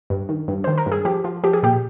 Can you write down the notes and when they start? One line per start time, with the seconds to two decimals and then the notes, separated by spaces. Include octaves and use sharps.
0.10 G2
0.29 D#3
0.48 G2
0.64 D#3 C5
0.78 A#4
0.86 G2
0.92 G#4
1.05 F3 G4
1.24 F3
1.43 F3 G4
1.53 G#4
1.63 A#2 G4